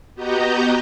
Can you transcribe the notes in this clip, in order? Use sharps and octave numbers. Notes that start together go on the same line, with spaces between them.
B3 F#4 G4 D#5 G5 A#5